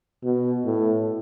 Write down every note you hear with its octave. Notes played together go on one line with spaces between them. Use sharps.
B2
A2